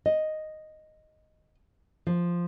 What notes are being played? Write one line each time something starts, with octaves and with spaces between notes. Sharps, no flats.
D#5
F3